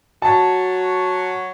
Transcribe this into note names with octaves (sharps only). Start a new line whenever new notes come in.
F#3 F#4 A5